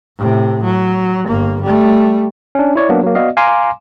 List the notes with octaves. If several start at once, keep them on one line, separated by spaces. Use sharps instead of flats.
A2 C3
F#3
G1 A#3
G3 A3
C#4 D4
E4 C#5 D5
F#3 A#3 B3 D4
F#3 A#3
B3 F#4 D5 D#5 F5
F5 G#5 A#5 C6 D6